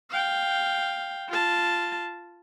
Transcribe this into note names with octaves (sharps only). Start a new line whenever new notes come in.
F5 G5
F4 A5